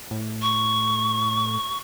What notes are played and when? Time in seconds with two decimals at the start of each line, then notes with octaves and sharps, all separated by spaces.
0.11 A2
0.42 C#6